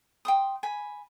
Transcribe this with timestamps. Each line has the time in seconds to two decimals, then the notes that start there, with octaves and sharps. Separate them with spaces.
0.25 G5 C6 D#6
0.63 G#5 B5